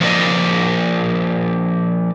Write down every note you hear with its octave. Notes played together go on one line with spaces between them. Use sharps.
F3 A3 A#3 D5 D#5